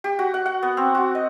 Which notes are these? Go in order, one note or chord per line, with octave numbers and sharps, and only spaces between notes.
G4
F#4
F#5
F#5
B3
C4
F#4
D#5